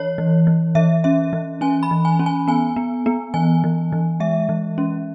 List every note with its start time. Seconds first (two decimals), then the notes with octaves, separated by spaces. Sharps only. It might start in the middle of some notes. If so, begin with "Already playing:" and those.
Already playing: E3 C#5
0.18 E3
0.47 E3
0.75 E3 E5
1.04 C#4 E5
1.33 E3
1.61 C#4 G#5
1.83 B5
1.91 E3
2.05 G#5
2.19 C#4
2.26 G#5
2.48 B3 G#5
2.76 B3
3.06 B3
3.34 E3 G#5
3.64 E3
3.92 E3
4.20 G#3 E5
4.49 E3
4.78 C#4